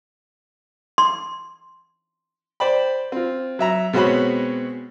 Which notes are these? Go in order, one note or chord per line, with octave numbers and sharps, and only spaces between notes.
C6
C5 D5 G5 B5
C4 F4
F#3 E5 A#5
B2 G#3 C4 F#4 C#5 B5